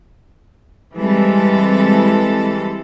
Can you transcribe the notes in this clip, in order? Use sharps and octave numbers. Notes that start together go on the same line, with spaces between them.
E3 G3 G#3 C4 A4